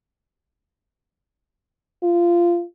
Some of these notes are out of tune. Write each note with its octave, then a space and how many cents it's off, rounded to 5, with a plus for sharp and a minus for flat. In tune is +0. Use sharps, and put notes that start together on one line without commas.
F4 -15